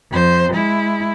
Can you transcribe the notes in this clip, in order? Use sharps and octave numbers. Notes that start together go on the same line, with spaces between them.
F2 C5
G#3 E4